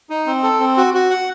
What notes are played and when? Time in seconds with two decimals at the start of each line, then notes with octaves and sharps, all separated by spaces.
0.10 D#4
0.26 C4
0.43 A4
0.60 C4
0.77 F#4
0.94 F#4
1.10 F#5